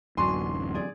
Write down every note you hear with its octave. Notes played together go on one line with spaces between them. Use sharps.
D1 F#2 D4 F#4 G#5 C6
G#4 D5